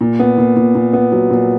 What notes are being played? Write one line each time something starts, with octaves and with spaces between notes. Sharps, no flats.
A#2
B3
A#2
A#2
A#2
B3
F#3
A#2